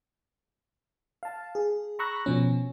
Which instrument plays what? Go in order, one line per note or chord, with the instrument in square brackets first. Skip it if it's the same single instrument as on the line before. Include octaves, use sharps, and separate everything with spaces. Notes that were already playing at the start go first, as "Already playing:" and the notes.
[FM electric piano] F5 A5
G#4
A#5 B5 C#6 E6 F#6 A#6
B2 F3 C#4